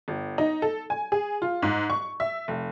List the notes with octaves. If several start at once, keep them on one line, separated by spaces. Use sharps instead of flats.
G1
D#4
A4
G#5
G#4
F4
G#2
C#6
E5
F1